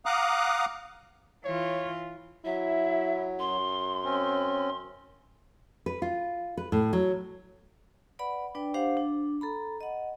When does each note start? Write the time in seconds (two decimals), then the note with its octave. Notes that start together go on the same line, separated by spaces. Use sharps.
0.06 F5 F#5 A#5 D6 D#6 F#6
1.45 E3 F4 C#5
2.45 F#3 E4 E5
3.39 F#2 C6
4.05 C4 C#4
5.86 B4
6.02 F4
6.57 B4
6.72 A2
6.93 F#3
8.19 B4 D5 F#5 B5
8.55 D4 B4 D5 G5
8.74 D4 G4 C5 F5 F#5
8.97 D4
9.41 A4 A#5 B5
9.81 D#5 F#5